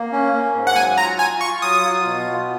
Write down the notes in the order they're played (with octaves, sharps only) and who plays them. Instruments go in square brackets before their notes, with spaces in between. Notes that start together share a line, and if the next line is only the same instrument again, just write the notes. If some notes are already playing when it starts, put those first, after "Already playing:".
Already playing: [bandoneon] A#3
C#4
A#3
G#2
[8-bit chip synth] F#5
[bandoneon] F#3 [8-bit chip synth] G#5
[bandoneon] F4 [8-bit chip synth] A#5
[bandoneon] F4 [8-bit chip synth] G#5
[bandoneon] F4 [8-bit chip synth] C#6
[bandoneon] F#3 [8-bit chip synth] D#6
[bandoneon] F4
B2
B3